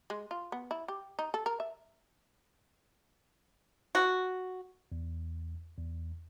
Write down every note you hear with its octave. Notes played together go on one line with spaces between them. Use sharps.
G#3
F4
B3
E4
G4
D#4
A4
A#4
E5
F#4
E2
E2